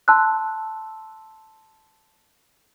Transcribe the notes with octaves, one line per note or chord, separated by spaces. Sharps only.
A5 C6 E6 F#6